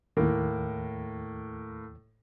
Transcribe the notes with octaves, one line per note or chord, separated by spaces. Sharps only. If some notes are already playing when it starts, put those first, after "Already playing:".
D#2 A2 A#3